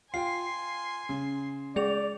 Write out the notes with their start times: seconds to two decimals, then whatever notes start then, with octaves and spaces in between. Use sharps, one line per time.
0.14 F4 G5 G#5 C6 C7
1.09 C#3
1.76 G#3 G#4 D5 F7